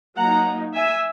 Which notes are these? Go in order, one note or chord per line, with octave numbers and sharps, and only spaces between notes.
F#3 A#3 D#4 F#5 A#5
E5 G#5